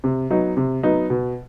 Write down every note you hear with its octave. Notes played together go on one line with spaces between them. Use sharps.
C3
F#3 B3 D#4
C3
F#3 B3 D#4
B2